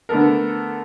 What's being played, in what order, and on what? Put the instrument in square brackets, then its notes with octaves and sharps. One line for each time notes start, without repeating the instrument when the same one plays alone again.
[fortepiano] D3 A3 B3 A4 A#4